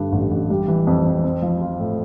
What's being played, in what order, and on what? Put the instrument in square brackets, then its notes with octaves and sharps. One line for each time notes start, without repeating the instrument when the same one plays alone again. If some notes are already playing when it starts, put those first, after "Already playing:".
Already playing: [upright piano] G2 D3
A1
A1
G3
E3
F2
F2
C4
F3
F4
A2